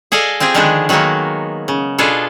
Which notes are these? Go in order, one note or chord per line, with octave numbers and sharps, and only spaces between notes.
G#4 A4 D5 D#5 F5
C4 F4 G4 G#4
D3 D#3 F3 G#3 B3 D4
D#3 F#3 G#3 A#3 B3
C#3
B2 B3 D4 F4 G#4 A4